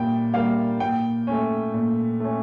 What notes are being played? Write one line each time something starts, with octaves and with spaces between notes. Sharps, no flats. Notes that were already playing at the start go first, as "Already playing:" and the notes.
Already playing: A#2 G3 A#3 G5
G3 A#3 F5
A#2 G5
A3 C#4
A#2
A3 C#4